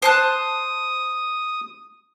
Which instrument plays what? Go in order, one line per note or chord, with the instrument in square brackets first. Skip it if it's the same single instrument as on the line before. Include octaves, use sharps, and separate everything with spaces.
[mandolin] C5 A5 F#6 [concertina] D#6